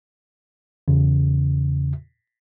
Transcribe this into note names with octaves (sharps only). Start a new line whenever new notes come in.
E2 C#3